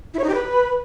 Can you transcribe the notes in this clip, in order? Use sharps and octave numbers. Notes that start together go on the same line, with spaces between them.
E4
C#5
D#4
G4
B4